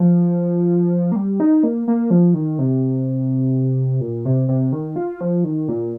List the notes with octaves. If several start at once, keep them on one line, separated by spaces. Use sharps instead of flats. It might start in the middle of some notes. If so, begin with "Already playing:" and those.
Already playing: F3
A#3
G3
D#4
A#3
A#3
F3
D#3
C3
A#2
C3
C3
D#3
F4
F3
D#3
A#2